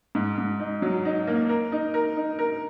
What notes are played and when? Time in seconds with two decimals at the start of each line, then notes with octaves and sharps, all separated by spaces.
0.15 G#2
0.38 G#2
0.60 D#4
0.82 F#3
1.05 D#4
1.27 A#3
1.49 A#4
1.72 D#4
1.94 A#4
2.16 D#4
2.39 A#4